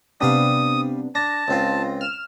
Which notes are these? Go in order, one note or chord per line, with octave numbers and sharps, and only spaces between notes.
C3 G3 B3 D4 B4 F5 D#6
D4 A5 A#6
C#2 C4 F4
F6 E7